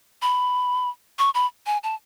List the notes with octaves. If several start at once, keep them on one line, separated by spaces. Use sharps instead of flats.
B5
C#6
B5
G#5
A5